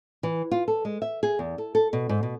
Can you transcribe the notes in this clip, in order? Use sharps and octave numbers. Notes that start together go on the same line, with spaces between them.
E3
F4
A4
G#3
E5
G#4
E2
A4
A4
B2
G#2
B2